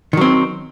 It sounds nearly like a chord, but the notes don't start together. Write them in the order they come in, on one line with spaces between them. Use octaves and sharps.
D#3 F#3 C4